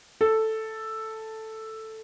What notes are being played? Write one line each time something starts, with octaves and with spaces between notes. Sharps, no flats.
A4